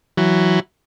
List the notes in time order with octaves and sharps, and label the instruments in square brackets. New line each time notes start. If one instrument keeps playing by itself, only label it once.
[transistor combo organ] E3 F#3